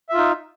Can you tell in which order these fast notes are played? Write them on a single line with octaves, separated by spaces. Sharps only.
E5 F4 D#4